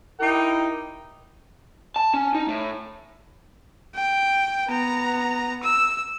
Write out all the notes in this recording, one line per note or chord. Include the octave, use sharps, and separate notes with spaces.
D#4 E4 G4 A#4 G5
A5
C#4
D#4
A2
G5
B3 A#5
E6